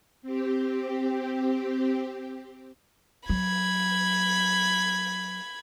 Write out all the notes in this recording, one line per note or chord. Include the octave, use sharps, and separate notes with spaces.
C4 G4
F#3 B5 G#6